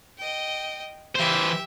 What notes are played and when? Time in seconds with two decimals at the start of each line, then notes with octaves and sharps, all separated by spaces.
0.18 D#5 G5
1.15 E3 G4 C5 E5